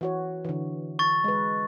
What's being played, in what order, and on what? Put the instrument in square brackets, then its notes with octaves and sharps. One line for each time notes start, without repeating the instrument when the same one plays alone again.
[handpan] E3 F#4 C#5
D3 E3
[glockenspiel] C#6 A6
[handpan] G#3 B4